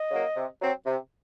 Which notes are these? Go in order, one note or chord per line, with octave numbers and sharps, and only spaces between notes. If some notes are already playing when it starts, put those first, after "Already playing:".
Already playing: D#5
C#3 F#3 A#3
C3
F#3 C4
C3